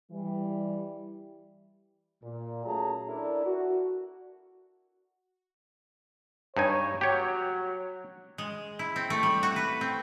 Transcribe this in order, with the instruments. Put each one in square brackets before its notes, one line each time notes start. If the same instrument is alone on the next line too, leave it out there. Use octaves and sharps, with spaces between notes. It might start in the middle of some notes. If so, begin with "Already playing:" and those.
[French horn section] E3 G3
[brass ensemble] A#2
F#3 A3 C#4 G#4 A5 A#5
D4 E4 A4 A#4 D5
F#4
[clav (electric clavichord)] G2 D#4 G#5 [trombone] C#5
[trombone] F#3 [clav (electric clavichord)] G4 C#5
[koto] G#3
E4
C4
A3
G3
F#4
B4
C4